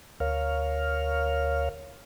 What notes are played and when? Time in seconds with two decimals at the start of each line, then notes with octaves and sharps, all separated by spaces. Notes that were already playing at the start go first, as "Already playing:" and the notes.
0.20 D2 A#4 C#5 F5 F6